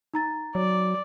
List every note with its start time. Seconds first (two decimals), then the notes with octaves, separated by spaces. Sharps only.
0.14 D#4 A#5 A6
0.55 F#3 D5